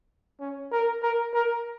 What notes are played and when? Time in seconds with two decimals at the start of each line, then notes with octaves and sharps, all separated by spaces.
0.40 C#4
0.72 A#4
1.03 A#4
1.34 A#4